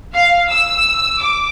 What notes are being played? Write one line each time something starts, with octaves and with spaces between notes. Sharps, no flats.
F5
E6
D6